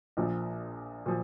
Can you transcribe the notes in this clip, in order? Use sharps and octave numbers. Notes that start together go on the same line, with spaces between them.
A#1 A#2 F3
A#2 F3